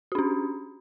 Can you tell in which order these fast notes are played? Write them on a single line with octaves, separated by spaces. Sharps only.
F#4 D4 C#4